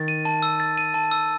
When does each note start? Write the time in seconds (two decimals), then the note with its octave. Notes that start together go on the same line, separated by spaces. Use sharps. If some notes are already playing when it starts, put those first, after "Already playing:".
Already playing: D#3 A6
0.08 D#7
0.25 A5
0.43 E6
0.60 A6
0.78 D#7
0.94 A5
1.11 E6